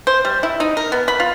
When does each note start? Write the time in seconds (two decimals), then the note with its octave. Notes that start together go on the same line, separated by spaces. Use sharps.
0.07 C5
0.25 G3
0.43 E4
0.60 D#4
0.77 A#4
0.92 B3
1.08 B5
1.20 F4